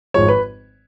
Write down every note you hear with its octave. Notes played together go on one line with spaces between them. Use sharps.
G#1 G#2 F3 G#3 C#5
B4